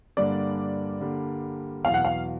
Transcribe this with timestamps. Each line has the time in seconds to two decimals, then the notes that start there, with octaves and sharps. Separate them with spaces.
0.17 G2 D3 G3 A#3 D5
1.01 G2 D3 G3 A#3
1.84 E2 B2 F#3 F5
1.94 F#5
2.05 F5